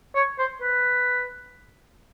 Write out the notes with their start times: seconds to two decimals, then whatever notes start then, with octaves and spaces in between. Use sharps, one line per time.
0.15 C#5
0.38 C5
0.62 B4